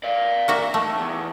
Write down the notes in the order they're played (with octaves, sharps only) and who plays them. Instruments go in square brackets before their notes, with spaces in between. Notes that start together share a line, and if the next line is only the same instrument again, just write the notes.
[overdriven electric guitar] D5 F5
[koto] A#3 F#4 E5
[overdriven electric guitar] D#3 [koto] A3
[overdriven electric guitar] E2